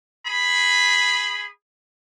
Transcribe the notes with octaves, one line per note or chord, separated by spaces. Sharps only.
G#4 B5